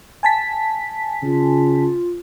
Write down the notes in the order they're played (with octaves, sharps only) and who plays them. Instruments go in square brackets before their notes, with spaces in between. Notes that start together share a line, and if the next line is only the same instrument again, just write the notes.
[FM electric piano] G#5 A5 B6
[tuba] C#3 [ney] F4